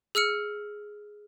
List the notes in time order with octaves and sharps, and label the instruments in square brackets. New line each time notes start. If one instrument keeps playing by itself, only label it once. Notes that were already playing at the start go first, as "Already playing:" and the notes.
[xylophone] G#4 E6 F6 C#7